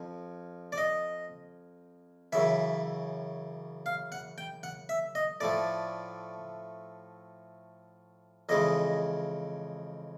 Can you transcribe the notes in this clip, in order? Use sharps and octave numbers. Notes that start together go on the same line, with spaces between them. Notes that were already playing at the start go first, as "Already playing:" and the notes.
Already playing: F2 F3
D5
D#5
F#2 C#3 E3 E5
F5
F#5
G5
F#5
E5
D#5
A2 F3 A3 D5
F2 C#3 E3 G#3 D#5